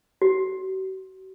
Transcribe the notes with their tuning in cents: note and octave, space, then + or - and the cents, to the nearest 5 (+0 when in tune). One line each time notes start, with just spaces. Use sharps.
F#4 +40